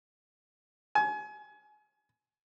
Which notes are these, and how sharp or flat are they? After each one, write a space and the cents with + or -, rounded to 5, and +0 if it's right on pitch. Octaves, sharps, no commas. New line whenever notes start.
G#5 +30